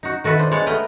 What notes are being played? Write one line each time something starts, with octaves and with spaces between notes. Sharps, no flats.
D#4 F#4
D#3 F#4 A4 B4 E5
D4 C5
G#3 B3 C#5 A5
A3 B3 A#4 B4 D#5 G5